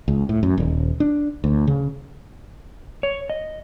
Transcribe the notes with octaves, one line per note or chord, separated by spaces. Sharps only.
C#2
A2
F#2
D#1
D4
D2
C#3
C#5
D#5